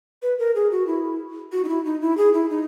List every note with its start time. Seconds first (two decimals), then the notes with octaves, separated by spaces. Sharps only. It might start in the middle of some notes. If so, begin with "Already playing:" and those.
0.23 B4
0.39 A#4
0.55 G#4
0.72 F#4
0.87 E4
1.52 F#4
1.64 D#4
1.69 E4
1.85 D#4
2.01 E4
2.17 G#4
2.34 E4
2.50 D#4